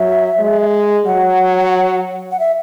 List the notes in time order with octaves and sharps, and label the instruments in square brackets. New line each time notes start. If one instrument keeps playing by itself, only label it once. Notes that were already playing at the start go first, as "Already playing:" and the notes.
Already playing: [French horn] F#3 [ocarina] E5
[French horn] G#3
[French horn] F#3 [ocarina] F#5
[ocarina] F#5
E5